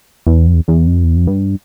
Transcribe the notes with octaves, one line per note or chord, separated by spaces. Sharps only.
E2
F2
E2
E2
F2
E2
F2
G2